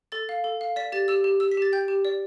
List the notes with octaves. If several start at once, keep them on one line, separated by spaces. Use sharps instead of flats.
A4 A6
F5
A4
F5
D5 B6
G4 A6
G4 E6
G4
G4 E6
B6
G4 A6
G5 G6
G4
D5